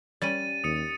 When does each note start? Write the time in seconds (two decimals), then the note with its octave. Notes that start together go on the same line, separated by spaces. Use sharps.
0.22 G3 C#4 G4 A6 D#7
0.64 D#2 D#6 C#7 D#7